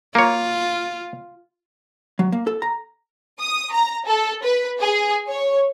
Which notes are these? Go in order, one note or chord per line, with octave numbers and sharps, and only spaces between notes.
A#3 F4 C#5
F#3
A#3
A4
A#5
D#6
A#5
A4
B4
G#4
C#5